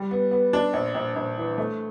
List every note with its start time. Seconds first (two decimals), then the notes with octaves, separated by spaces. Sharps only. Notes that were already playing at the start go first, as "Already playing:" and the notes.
Already playing: G3
0.11 B3
0.31 B3
0.53 D4
0.73 A#1
0.94 A#1
1.16 A#1
1.37 E3
1.58 A3